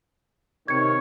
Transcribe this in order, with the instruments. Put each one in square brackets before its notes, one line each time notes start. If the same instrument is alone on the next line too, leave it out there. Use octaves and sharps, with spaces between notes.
[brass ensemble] C3 D#3 [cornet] C#5 [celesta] G#6 C#7